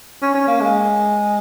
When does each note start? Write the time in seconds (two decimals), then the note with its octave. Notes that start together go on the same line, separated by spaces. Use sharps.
0.22 C#4
0.34 C#4
0.48 A#3
0.61 G#3